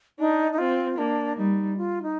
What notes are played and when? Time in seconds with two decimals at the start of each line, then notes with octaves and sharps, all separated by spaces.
0.19 D4 D#4
0.52 D#4
0.58 C4 F4
0.98 A#3 D4
1.37 G3 D#4
1.77 F4
2.03 D#4